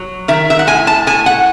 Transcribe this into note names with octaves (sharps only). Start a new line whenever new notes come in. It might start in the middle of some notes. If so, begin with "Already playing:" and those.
Already playing: F#3
D#3 E5
E5
F#5
A2 G#5
A5
A2 G#5
F#5